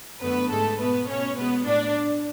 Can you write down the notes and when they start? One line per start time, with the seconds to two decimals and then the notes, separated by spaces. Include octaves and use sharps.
0.22 F#2 D3 A3 B3 B4
0.50 G#2 G#3 A3 A4
0.79 B2 A3 B3 B4
1.08 B2 A3 C#4 C#5
1.37 B2 G#3 B3 B4
1.66 A2 D4 D5